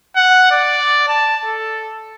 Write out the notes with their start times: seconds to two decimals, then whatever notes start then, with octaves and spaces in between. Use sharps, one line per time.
0.16 F#5
0.51 D5
1.08 A5
1.45 A4